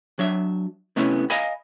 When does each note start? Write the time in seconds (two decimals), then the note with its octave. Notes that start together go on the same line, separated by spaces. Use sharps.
0.19 F#3 D4 E5
0.96 C3 A3 B3 C#4 E4
1.30 D#5 F5 G#5 A#5 B5